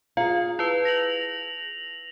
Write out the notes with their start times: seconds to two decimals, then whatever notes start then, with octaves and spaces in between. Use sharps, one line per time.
0.17 F4 G#4 F5
0.59 E4 B4
0.85 A#6 F7 F#7